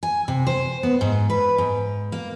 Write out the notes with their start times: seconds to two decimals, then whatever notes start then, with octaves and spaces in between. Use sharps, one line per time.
0.03 G#5
0.28 C3
0.47 C5
0.83 B3
1.01 G#2
1.30 B4
1.58 G#2
2.12 A#3